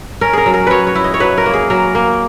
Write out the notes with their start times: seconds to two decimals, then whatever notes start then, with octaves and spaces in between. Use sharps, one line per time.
0.21 C#4 A#4
0.33 G#4 A#4
0.46 F#3
0.54 A#4
0.67 F#3 B4 C#5
0.87 C#5
0.95 E4
1.04 D#5
1.14 C#5
1.20 F#3 B4
1.38 A#4
1.46 A#3
1.53 G#4
1.70 F#3 A#4
1.95 A#3